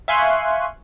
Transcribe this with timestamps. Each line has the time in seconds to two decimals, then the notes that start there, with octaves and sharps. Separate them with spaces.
0.08 E5 F5 G#5 C6 C#6 F#6